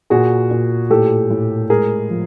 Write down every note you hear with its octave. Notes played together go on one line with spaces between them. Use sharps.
A#2 F#4 G#4
A#2
A2 G4 A4
A2
G#3 G#4 A#4
F3